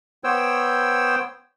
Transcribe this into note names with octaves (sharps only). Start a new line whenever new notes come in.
B3 C5 C#5 G5 E6